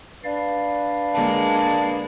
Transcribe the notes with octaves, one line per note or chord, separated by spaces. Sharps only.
D4 B4 D5 F5
D3 G#3 A#3 A5